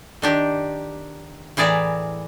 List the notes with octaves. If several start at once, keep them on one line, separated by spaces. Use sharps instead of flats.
D#3 D4 G4
A2 E3 G#4 D5 A#5